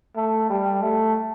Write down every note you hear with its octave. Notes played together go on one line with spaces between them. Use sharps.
A3
G3
A3